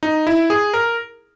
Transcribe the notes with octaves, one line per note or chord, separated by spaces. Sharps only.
D#4
E4
G#4
A#4